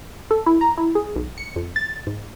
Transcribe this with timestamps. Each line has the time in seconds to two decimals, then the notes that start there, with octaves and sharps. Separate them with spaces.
0.31 A4
0.46 E4
0.61 A#5
0.78 E4
0.95 G#4
1.16 B1
1.38 C#7
1.56 F2
1.76 A6
2.07 G#2